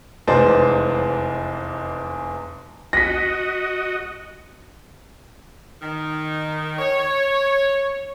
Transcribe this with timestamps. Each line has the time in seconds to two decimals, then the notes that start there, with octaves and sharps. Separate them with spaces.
0.28 F1 E2 G#3 B3 C5 D5
2.93 F#4 D#5 A#6 B6
5.82 D#3
6.78 C#5